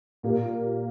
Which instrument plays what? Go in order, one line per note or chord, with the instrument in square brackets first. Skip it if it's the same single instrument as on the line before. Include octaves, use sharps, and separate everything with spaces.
[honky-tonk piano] A#2 A#3 G4